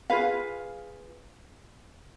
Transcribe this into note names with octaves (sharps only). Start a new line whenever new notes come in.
F4 G#4 B4 F5